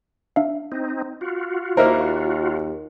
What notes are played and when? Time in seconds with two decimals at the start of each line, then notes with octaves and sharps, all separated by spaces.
0.36 D4 E5 F5
0.72 C4 D#4
1.21 F4 F#4
1.77 D#2 A#3 E4 A#4 C5 D#5 F6